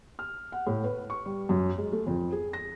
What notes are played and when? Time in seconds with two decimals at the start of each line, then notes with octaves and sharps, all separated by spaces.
0.19 F6
0.52 F#5
0.67 A2
0.84 B4
1.10 C#6
1.26 G3
1.49 F#2
1.78 G#3
1.93 A3
2.07 F2
2.32 G#4
2.53 A#6